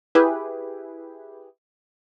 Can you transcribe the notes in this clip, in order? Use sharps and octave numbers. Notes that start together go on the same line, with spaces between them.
E4 G4 G#4 B4